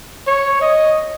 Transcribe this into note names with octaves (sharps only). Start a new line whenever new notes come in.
C#5
D#5